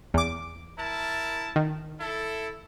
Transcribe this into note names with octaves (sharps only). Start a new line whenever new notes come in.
E2 D6
E4 A#4 A5
D#3
E4 A4